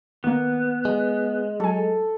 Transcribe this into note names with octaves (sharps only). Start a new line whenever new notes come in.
D#3 A#3 B3
G#3
F#3 A4 G#5